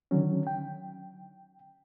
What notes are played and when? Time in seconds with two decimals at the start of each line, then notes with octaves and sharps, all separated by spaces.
0.11 D3 D#3 F#3 C#4
0.47 G5